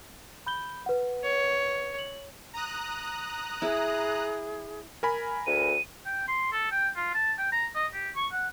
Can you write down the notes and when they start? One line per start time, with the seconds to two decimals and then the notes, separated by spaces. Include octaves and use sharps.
0.46 B5 G6 G7
0.86 B4 F#5
1.24 C#5
1.99 F#7
2.53 A#5 D#6 F#6
3.62 E4 G#4
5.03 A#4 G#5 B5
5.47 D2 D#7
6.06 G5
6.28 C6
6.52 A4
6.71 G5
6.96 F4
7.14 A5
7.39 G5
7.52 A#5
7.75 D#5
7.94 G4
8.16 C#6
8.32 F#5